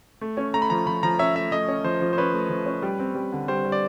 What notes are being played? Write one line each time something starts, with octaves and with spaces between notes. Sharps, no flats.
A3
C#4
A3 A#5
B5
F3 A#5
F3 B5
F3 A#5
C#4 E5
A3 E5
A3 D#5
C#4
F3 C5
F3
C5
C#4 B4
A3
F3
C#4
G3
C4
G3
D3
G3 C5
G3
D5